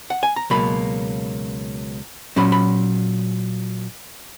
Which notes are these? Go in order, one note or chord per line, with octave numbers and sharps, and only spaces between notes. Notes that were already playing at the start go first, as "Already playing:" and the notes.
F#5
G#5
A#5
C#2 B2 F#3 A#3 B5
A#2 F#3 C#4 B5
B5